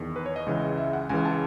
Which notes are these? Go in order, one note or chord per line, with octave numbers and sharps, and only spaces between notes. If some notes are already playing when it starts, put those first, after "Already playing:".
Already playing: E2 D#3
B4
C#5
D#5
C#2 C#3 E3
E5
F#5
C#2 C#3 E3 G#5
A5